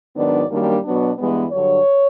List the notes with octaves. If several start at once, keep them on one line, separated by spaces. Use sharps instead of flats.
G#2 D#3 F#3 B3 D4 D5
F#2 D#3 G3 A#3 D4
B2 F#3 B3 D4
G2 E3 G#3 B3
G2 D3 F#3 C#5